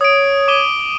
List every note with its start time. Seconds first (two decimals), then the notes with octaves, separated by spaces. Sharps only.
0.01 C#5 D#6 D7
0.48 D6 D#7 G7